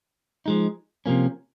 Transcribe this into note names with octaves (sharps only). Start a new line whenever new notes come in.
F3 G#3 D#4
C3 F3 A#3 C#4